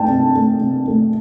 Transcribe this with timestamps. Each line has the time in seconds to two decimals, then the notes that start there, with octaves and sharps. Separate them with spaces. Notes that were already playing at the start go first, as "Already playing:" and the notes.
Already playing: A3 G5 A5
0.08 C3
0.35 A3
0.61 C3
0.87 A3